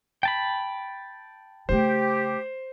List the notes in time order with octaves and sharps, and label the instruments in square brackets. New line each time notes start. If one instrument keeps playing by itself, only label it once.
[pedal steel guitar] G5 A5 B5
[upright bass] C#3 A3 [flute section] G4 [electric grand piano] C5